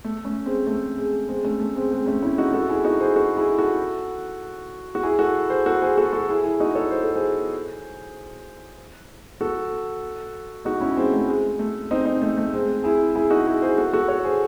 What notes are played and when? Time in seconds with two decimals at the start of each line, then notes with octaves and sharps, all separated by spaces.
0.04 A3
0.25 A3 C#4
0.46 G#3 C4
0.67 A3
0.98 G#3
1.29 G#3 C4
1.44 A3 C#4
1.60 A3
1.76 G#3 C4
1.92 G#3 C4
2.06 A3 C#4
2.23 C#4 E4
2.38 D#4 F#4
2.53 F#4 A4
2.69 E4 G#4
2.84 D#4 F#4
3.00 G#4 C5
3.16 F#4 A4
3.37 E4 G#4
3.58 F#4 A4
4.95 F#4
5.03 E4 G#4
5.19 F#4 A4
5.50 G#4 C5
5.66 F#4 A4
5.82 G#4 C5
5.98 F#4 A4
6.13 F#4 A4
6.28 E4 G#4
6.43 E4 G#4
6.60 D#4 F#4
6.75 A4 C#5
6.91 C5
7.03 A4
7.15 G#4 C5
9.41 F#4 A4
10.65 D#4 F#4
10.80 C#4 E4
10.97 G#3 C4
11.12 A3
11.28 G#3
11.59 A3
11.91 C4 D#4
12.05 C4 D#4
12.22 A3
12.37 A3
12.53 G#3 C4
12.84 E4 G#4
13.16 E4 G#4
13.30 D#4 F#4
13.47 E4 G#4
13.62 G#4 C5
13.78 F#4 A4
13.93 F#4 A4
14.08 A4 C#5
14.24 G#4 C5